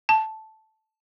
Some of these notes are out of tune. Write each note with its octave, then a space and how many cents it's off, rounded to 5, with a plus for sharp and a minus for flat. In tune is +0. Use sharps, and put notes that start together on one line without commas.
A5 -5